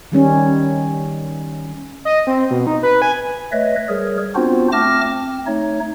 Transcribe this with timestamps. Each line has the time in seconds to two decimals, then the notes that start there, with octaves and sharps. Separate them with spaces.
0.12 D#3 G3 C#4 D#4
2.05 D#5
2.27 C4
2.51 B2
2.67 D#4
2.83 B4
3.02 G#5
3.52 A3 B4 C#5 D#5 E5
3.89 G3 G#4 A#4 C#5
4.35 B3 C4 D4 F4 F#4 C5
4.72 A3 C4 A5 D6 F6 A#6
5.11 C4
5.47 A3 D#4 C#5